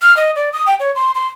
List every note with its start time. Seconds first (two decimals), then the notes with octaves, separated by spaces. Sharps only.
0.02 F6
0.17 D#5
0.36 D5
0.53 D#6
0.67 G5
0.80 C#5
0.95 C6
1.15 C6